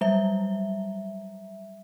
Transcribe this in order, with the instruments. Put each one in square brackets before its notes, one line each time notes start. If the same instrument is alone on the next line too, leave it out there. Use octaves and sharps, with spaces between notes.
[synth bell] F#3 G3 E5